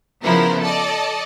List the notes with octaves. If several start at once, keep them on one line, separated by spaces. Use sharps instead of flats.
C#3 F3 B3 E4 A#4 C5
A4 D5 D#5